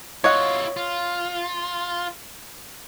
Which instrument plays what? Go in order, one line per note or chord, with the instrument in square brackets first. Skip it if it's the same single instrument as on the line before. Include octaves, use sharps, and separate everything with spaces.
[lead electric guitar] E4 F4 [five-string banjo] C#5 D#5 F#5
[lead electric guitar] F4